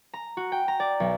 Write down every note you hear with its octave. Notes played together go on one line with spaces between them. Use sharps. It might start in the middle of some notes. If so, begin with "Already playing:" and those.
A#5
F#4
G5
A#5
D5
B1